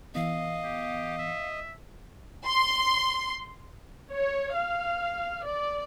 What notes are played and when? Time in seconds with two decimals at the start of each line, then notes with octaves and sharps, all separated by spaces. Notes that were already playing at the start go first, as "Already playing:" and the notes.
0.15 E3 B3 D#5 F5
0.64 G4
1.19 E5
2.45 C6
4.11 C#5
4.55 F5
5.46 D5